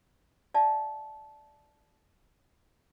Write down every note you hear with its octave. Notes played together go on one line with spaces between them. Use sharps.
D5 E5 F5 A5